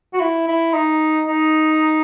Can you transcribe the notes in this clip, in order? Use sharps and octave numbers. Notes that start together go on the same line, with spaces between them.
F#4
E4
E4
D#4
D#4